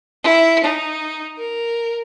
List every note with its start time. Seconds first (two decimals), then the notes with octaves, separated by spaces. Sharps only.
0.23 E4
0.64 D#4
1.38 A#4